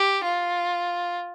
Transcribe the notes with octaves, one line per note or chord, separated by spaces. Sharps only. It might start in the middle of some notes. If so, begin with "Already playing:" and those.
Already playing: G4
F4